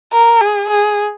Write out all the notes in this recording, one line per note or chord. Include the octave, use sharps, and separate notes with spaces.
A#4
G#4
G#4